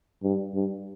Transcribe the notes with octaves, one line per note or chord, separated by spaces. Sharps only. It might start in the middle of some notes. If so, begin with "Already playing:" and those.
G2
G2